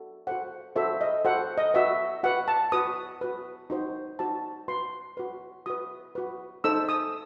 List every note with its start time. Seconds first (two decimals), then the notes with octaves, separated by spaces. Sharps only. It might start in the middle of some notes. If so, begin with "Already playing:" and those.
Already playing: F#4 A4
0.27 F#4 A4 C5 F#5
0.76 F#4 A4 C5 E5
1.01 D#5
1.25 F#4 A4 C5 F#5
1.58 D#5
1.74 F#4 B4 E5
2.23 F#4 B4 F#5
2.48 A5
2.72 F#4 B4 D#6
3.21 F#4 B4
3.70 D#4 F#4 C5
4.19 D#4 F#4 C5 A5
4.68 F#4 B4 C6
5.17 F#4 B4
5.66 F#4 B4 D#6
6.15 F#4 B4
6.64 D#4 A4 C5 E6
6.89 D#6